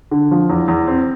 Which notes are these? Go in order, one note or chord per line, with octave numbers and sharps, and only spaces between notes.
D3
F3
E2
E2
C4